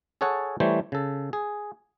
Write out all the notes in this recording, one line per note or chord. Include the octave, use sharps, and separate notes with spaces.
G#4 A4 C#5 F#5 G#5 A5
E3 G3 A3 C5 C#5
C#3 A4
G#4